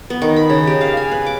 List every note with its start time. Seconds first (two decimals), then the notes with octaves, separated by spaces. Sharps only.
0.10 B3
0.22 D#3
0.36 B5
0.50 C#3
0.67 G4
0.81 F5
0.97 G#5
1.12 B4
1.26 D6